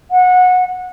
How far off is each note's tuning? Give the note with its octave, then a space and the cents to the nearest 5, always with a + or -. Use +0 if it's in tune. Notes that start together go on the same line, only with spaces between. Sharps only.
F#5 -20